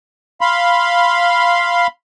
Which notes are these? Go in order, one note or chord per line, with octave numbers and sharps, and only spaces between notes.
F5 B5 C6